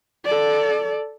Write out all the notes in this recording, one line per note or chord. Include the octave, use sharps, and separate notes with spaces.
A4 D5